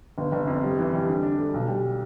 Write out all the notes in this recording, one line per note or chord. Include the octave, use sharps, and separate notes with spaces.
G1
G1
F2
G3
E3
G3
D3
D4
A3
B1
G3